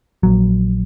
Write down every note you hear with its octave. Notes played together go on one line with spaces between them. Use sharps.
A#1 F#3